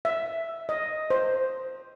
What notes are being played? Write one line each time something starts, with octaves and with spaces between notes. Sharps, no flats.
E5
D#5
C5